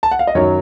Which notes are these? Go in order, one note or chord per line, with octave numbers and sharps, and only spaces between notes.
A5
F#5
F5
D#5
F#2 D#3 F#3 C#5